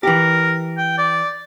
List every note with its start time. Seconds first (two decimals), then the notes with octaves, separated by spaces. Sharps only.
0.03 E3 G4 A#4
0.77 G5
0.98 D5